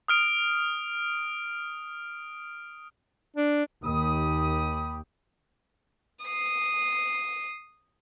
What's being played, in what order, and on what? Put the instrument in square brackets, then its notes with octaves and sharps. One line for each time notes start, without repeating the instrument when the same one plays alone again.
[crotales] D#6 F6 D7
[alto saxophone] D4
[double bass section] D#2 [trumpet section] G4 B5 D#6
[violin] D#6 C7